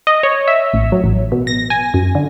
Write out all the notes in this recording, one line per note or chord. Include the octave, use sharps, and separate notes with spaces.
D#5
C#5
E5
A1
F#3
A1
B2
A#6
G#5
F#2
D3